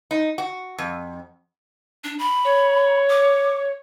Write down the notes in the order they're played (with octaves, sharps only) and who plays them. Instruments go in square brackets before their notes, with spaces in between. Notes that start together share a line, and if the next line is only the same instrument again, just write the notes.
[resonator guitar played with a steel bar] D#4
F#4
F2
[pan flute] D4
B5
[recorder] C#5
[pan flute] D6